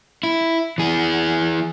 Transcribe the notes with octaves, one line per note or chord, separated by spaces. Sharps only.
E4
E3 G#4